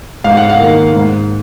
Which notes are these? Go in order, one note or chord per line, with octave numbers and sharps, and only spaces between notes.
G#2 F5
F#5
F5
D#3 A#3
G#2